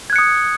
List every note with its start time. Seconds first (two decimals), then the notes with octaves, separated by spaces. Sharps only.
0.10 G#6
0.13 F#6
0.16 C#7
0.19 D#6